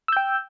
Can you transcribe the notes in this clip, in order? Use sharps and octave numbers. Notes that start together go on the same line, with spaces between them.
G5 E6 G6